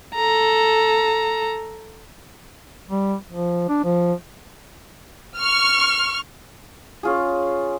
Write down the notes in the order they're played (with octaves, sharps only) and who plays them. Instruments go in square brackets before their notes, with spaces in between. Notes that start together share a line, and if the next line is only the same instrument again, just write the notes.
[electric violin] A4 A#5
[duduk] G3
F3
D4
F3
[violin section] C#6 F6
[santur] C#4 F4 G#4